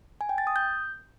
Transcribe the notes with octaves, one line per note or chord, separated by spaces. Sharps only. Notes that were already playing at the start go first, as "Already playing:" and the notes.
G#5
G5
A6
D#6
G6